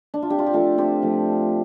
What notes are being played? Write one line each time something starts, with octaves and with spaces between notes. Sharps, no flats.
D4
F4
C3 D4 G4
F4
G4
F3 A3 F4 A4
C3 G4 C5
F3 A3